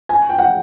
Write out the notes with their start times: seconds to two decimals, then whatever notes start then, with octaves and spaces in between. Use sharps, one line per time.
0.09 G#5
0.29 G5
0.38 F#5